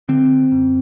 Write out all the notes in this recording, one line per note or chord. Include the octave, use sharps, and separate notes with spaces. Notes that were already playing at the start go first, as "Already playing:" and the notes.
D3 C4
F#2